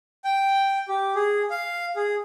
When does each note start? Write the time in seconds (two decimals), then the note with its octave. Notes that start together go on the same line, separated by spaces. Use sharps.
0.24 G5
0.88 G4
1.15 G#4
1.50 F5
1.96 G#4